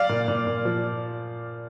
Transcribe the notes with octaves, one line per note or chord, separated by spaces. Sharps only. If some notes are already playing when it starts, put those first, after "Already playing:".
Already playing: D5 F5
A#2
A#2
A#2
F3